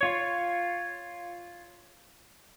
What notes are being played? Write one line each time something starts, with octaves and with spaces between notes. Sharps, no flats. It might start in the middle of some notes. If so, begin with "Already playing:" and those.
F4 C#5